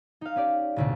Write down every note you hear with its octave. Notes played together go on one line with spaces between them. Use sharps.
D#4 F5
C#4 G4 D5
A1 D2 B2